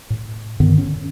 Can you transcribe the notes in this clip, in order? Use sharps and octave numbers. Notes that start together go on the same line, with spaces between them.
A2
G2 D3 D#3 B3
C#4